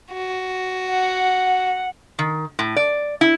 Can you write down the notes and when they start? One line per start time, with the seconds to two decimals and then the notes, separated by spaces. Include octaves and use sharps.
0.13 F#4
0.90 F#5
2.19 D#3
2.59 A2
2.76 D5
3.21 E4